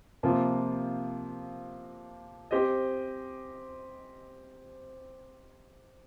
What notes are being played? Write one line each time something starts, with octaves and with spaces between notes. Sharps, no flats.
C3 F3 A#3 F4
C4 G4 C5 D#5